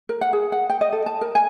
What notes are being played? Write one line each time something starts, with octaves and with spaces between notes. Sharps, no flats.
A#4
F#5
G#4
F#5
G5
D#5
A4
A5
A#4
G#5